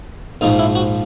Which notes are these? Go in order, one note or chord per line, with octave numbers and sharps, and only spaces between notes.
A#1 G#2 F3 D#4
E4
F#4